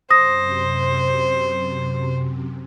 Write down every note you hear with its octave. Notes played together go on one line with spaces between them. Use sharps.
F#2 C3 C5 D#6 A#6